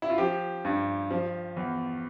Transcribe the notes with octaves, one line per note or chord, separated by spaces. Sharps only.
E4
F4
F3 G4
G2
F3
E2